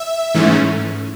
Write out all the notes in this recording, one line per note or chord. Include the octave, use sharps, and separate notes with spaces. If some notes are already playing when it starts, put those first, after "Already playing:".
Already playing: E5
G#2 E3 A3 C#4